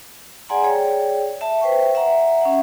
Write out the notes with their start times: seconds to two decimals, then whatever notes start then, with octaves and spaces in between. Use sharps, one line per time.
0.49 G#4 D5 F#5 G#5 A#5 C6
0.64 G#4 C#5 D5 G5
1.41 E5 A5
1.61 B4 C5 E5 G5 C#6
1.95 E5 F#5 A#5
2.41 C#4 E5 F#5